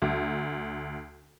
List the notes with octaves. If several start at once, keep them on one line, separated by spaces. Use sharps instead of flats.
D2